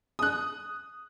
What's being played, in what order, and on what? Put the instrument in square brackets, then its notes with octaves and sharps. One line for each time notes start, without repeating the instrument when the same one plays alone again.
[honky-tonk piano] D#6 F#6